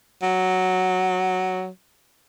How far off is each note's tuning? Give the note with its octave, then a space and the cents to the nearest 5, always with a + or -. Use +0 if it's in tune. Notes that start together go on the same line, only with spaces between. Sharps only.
F#3 +0